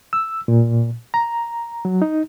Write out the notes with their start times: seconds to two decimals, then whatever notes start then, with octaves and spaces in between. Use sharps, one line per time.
0.13 E6
0.48 A#2
1.14 A#5
1.85 F#3
2.02 D#4